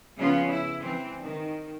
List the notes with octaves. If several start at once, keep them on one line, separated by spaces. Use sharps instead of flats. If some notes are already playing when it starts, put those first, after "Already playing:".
C#3 F3 B3 C#4 F4
E4
E3 C4
D#3